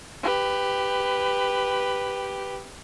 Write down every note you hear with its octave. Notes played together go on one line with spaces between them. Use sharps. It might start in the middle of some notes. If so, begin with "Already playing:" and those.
G4 B4